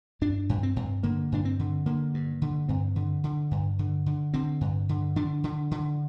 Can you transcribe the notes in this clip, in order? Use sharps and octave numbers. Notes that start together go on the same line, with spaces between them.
G2 D4
G2
C4
G2
D3 A#3
G2 D4
C4
D3
D3 A#3
G2
D3
G2 C4
D3
D3
G2
D3
D3
D3 C4
G2
D3
D3 D4
D3
D3